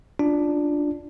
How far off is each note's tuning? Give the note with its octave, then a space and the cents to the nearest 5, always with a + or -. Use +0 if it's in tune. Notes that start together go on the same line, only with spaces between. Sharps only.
D4 +0 F4 +0